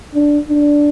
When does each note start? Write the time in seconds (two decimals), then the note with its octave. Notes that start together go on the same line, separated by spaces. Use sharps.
0.15 D4
0.49 D4